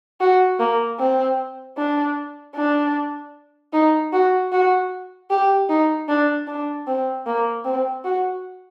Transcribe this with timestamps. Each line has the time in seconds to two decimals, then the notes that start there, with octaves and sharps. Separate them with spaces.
0.21 F#4
0.60 A#3
1.00 C4
1.77 D4
2.56 D4
3.73 D#4
4.13 F#4
4.52 F#4
5.30 G4
5.70 D#4
6.08 D4
6.47 D4
6.87 C4
7.26 A#3
7.65 C4
8.05 F#4